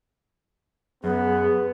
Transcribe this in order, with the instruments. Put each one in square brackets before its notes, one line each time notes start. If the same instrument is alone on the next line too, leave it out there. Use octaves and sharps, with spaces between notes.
[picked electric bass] F#2 [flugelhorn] B3 [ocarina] G#4